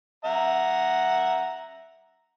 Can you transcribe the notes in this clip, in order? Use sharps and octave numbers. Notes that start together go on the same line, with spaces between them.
E5 F#5 A#5